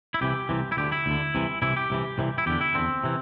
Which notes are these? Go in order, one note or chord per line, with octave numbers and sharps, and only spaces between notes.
E4
C2 C3 E3 G4
C2 C3 E3
E4
D2 D3 G4
E4
D2 D3
C2 C3 E3
C2 C3 E3 E4
G4
C2 C3 E3
C2 C3 E3
E4
E2 D3 G4
E4
E2 D3 C4
C3 E3